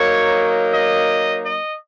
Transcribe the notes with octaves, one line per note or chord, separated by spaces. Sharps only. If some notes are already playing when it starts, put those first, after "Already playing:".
Already playing: F#3 A#3 D#4 C#5
D#5
D#5